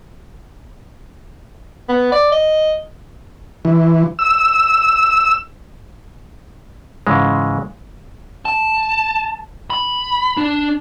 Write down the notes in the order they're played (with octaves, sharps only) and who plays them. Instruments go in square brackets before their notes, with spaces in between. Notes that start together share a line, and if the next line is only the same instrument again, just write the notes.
[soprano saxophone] B3
D5
D#5
[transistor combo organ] E3
E6
[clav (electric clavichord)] G#2 C#3 E3 G#3
[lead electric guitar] A5
B5
D4